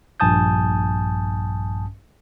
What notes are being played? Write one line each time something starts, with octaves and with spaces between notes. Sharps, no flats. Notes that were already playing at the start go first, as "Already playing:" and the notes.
A#1 G2 G#5 A5 D#6 G6